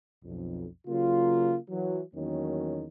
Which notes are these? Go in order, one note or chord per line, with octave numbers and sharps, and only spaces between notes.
B1 F2
C#3 F#3 A#3 F4
E3 F#3
E2 D#3 F#3 A#3 C#4